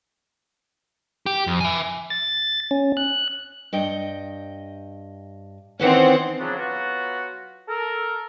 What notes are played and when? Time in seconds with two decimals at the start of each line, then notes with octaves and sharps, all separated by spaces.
1.26 G4
1.47 F2
1.60 E5 G#5
2.10 A6
2.71 C#4
2.97 F#6
3.73 G2 D#5 G5
5.79 D#3 E3 C4 C#4 F#5
6.39 C#3 F3 F#3 B3 D4
6.57 F#3 B3 F4 F#4
7.68 A4 A#4